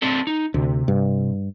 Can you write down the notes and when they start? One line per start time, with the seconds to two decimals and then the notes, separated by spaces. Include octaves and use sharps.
0.02 C4 D4 A4
0.27 D#4
0.54 D2 C3
0.88 G2